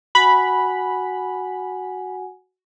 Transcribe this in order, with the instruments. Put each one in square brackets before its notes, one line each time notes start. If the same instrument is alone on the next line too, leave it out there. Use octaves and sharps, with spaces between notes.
[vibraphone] F#4 F#5 G#5 [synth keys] B5